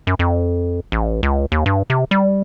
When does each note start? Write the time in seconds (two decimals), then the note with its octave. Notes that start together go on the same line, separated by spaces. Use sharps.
0.07 F#2
0.19 F2
0.92 A1
1.23 C#2
1.52 D#2
1.66 G2
1.90 C3
2.11 G3